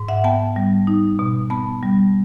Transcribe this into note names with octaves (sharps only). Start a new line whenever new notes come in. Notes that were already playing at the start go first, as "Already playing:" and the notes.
Already playing: G#2
E5 F#5
B3 G5 A5
G3
D#4
B2
B3 A5 B5
G3